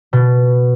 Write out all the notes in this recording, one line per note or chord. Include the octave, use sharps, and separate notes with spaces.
B2